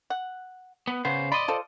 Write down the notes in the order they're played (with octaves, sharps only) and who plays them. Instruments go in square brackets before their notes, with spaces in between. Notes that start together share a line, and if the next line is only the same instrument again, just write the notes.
[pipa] F#5
[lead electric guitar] B3
[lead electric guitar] C#3 C5 [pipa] B3
[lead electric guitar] D5 D#5 [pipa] B5 C6
[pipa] F4 A4 C5